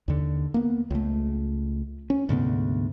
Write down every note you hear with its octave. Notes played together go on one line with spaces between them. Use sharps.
D#2 D3
A#3 B3
C#2 A3
C#4
D2 G#2 C3 B3